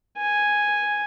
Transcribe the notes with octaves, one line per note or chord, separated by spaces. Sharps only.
G#5